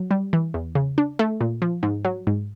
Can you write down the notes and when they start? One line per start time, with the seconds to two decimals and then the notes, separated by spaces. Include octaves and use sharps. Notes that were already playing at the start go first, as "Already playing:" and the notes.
Already playing: F#3
0.11 G3
0.33 E3
0.54 E2
0.75 C#3
0.98 D4
1.19 A3
1.41 A#2
1.62 F3
1.83 G#2
2.05 F#3
2.27 G#2